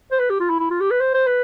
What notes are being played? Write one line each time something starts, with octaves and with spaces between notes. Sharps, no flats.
C5
B4
G4
F4
E4
E4
F4
G4
B4
C5
C5
B4